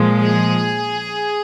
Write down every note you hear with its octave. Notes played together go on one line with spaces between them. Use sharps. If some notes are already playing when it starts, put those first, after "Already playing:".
Already playing: A#2 F3 G#3
G#4